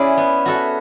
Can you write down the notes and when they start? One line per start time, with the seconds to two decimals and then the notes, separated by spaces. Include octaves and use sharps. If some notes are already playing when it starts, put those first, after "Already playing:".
Already playing: C#4 E4 G#4 D5
0.17 B3
0.46 F#4 A4 E5